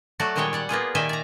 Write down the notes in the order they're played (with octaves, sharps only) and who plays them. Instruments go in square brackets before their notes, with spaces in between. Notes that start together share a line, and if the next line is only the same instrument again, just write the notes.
[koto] F#3 A3 F#4 D5
A#2 D#3 G3 G#3 C#5 G5
G3 D5 F#5
A#3 B3 F4 G#4
A#2 D#3 G3 E5 G5 G#5
D5 A#5